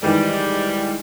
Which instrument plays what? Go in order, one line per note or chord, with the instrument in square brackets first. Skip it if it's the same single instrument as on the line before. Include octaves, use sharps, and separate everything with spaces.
[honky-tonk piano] G#2 D#3 E3 [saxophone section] G3